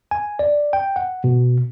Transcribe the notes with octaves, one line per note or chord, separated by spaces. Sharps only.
G#5
D5
G5
F#5
B2